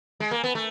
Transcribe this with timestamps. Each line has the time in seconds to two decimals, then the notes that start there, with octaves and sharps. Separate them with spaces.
0.20 G#3
0.31 A#3
0.44 B3
0.55 A3